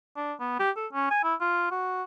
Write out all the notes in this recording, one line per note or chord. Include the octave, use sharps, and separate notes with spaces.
D4
B3
G4
A4
C#4
G#5
E4
F4
F#4